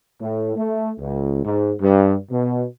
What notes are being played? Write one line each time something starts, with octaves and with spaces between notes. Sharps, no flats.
A2
A3
C#2
G#2
G2
B2